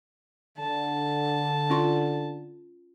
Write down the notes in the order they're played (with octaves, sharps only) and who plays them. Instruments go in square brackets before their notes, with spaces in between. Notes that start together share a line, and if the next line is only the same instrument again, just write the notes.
[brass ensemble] D3 [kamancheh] A5
[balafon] C#4 F4 C6